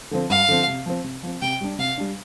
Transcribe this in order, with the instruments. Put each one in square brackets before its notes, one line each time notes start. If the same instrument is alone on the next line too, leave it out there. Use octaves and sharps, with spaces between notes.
[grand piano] D3 F3 C4
[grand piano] G2 [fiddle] F5
[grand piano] D3 F3 C4
C3
F3 C4
C3
F3 C4
[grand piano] C3 [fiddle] G5
[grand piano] G3 D4
[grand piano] C3 [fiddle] F5
[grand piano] G3 D4